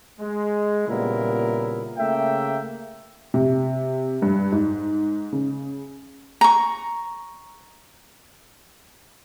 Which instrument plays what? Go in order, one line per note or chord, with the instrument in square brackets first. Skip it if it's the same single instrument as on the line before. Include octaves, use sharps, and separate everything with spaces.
[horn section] G#3
A#2 C#3 G3 B3 E4 A#4
C#3 A3 A#3 E5 G5
[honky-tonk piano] C3
G2
G#2
C#3
[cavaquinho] A#5 C#6